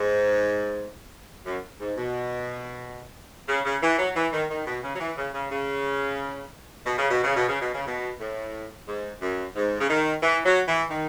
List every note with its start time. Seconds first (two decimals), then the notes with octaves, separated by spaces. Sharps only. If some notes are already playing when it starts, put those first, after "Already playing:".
Already playing: G#2
1.46 F#2
1.80 G#2
1.97 B2
3.49 C#3
3.66 C#3
3.83 E3
3.99 F#3
4.16 E3
4.33 D#3
4.50 D#3
4.67 B2
4.83 C#3
4.95 F#3
5.00 E3
5.17 C#3
5.34 C#3
5.51 C#3
6.86 B2
6.99 C#3
7.11 B2
7.24 C#3
7.36 B2
7.49 C#3
7.61 B2
7.74 C#3
7.87 B2
8.20 A2
8.88 G#2
9.22 F#2
9.56 G#2
9.80 C#3
9.90 D#3
10.23 E3
10.45 F#3
10.68 E3
10.90 D#3